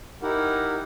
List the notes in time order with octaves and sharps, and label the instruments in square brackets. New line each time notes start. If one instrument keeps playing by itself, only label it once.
[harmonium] D#4 E4 G4 A#4 F#5